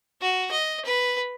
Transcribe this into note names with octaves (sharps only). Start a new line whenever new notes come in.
F#4
D#5
B4